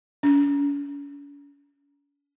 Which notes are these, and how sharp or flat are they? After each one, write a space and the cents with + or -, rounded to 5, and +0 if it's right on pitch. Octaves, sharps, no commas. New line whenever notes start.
C#4 +45